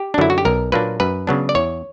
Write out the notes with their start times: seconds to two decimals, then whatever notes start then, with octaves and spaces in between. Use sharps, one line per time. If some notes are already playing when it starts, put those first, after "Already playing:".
Already playing: G4
0.14 D4
0.18 F#2 D3 F#3 E4
0.30 F#4
0.38 G4
0.45 B1 A#4
0.72 A#2 F#3 A#3 D4 B4
1.00 F#2 B4
1.27 C#3 F#3 B3 D4
1.49 D5
1.55 E2 C#5